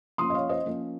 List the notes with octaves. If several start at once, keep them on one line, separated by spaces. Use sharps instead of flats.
F3 A#3 C#4 C6 D#6
D#5
C#5 F5
C5 D#5
F3 A#3 C#4